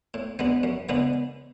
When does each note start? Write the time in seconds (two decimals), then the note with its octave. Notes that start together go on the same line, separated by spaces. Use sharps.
0.14 A2
0.39 G#3 B3 D4
0.63 F#2
0.89 C#3 G#3 B3 D4